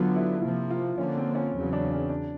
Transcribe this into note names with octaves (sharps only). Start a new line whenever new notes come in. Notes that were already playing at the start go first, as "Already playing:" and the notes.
Already playing: D3 F#3 B3 F4
E4
C3 F3 A#3 F4
F4
D3 F3 A#3 C#4
C4
C#4
E2 C#3 F#3
D4
C#4
D4